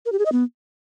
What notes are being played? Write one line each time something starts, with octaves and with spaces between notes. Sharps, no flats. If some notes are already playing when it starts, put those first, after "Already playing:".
A#4
G4
G#4
D#5
B3